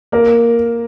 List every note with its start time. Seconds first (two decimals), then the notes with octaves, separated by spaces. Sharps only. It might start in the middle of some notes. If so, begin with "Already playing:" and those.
0.12 A#3 A#4